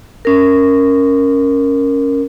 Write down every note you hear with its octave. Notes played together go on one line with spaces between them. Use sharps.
C#4 A#4